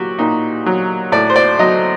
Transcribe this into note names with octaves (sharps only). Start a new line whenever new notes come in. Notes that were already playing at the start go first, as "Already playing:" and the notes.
Already playing: A#2 F#3 F#4 G4
A#2 D#4
F#3
A2 D5
C5
D5
F#3 D#5